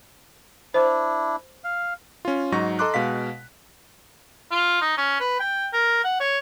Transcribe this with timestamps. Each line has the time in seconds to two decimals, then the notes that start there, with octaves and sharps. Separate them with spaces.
0.74 D4 E4 C5
1.64 F5
2.25 C#4 F4
2.52 G#2 F#3 D#4 C#6 A#6
2.79 A4 D#5 A#5 C6 D6 F#6
2.94 B2 G#3 F5 B6
4.51 F4
4.81 D#4
4.97 C#4
5.20 B4
5.40 G5
5.73 A#4
6.04 F#5
6.20 C#5